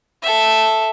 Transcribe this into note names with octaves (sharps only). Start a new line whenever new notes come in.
A4 E5